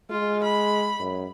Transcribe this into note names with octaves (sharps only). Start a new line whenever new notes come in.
G#3 F4
B5
F#2